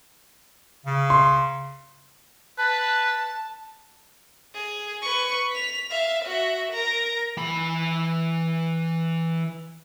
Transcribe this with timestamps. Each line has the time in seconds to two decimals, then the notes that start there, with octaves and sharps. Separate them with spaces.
0.86 C#3
1.10 C6
2.58 B4 A5
4.55 G#4
5.02 B4 C#6
5.51 B6 F7
5.90 E5 F5
6.25 F#4 E5
6.72 A#4 A#5
7.37 E3 B5